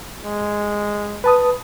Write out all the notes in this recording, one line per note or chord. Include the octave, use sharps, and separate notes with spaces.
G#3
B4 A5 D#6